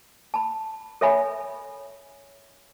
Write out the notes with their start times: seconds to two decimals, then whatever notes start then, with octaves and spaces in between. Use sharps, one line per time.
0.34 A5 B5
1.01 A4 C#5 E5 G#5 B5